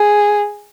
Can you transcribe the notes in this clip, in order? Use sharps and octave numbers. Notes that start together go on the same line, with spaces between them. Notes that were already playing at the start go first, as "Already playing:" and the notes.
Already playing: G#4